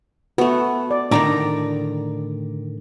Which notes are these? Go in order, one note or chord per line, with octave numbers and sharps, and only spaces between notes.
A3 B3 F#4
D5
A2 D3 D#3 D4 D5 A#5